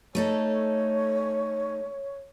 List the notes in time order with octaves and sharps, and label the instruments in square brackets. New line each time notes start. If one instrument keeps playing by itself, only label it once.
[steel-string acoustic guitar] A3 D#4 A4 [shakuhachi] C#5